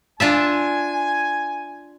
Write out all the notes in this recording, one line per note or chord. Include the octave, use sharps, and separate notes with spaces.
D4 F4 E5 G#5